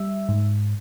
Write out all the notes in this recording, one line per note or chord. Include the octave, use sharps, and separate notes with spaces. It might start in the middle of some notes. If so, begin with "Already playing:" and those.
Already playing: G3 E5
G#2